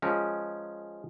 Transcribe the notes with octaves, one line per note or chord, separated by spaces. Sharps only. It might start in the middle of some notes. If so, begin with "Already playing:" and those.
F3 G#3 C#4 A#4